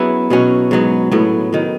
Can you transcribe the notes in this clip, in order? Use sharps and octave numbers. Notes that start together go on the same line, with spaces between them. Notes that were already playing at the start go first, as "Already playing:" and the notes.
Already playing: F#3 B3 C#4 E4 G#4 B4
B2 F#3 C#4 F#4
G#2 F#3 B3
A2 F#3 B3
D#3 F#3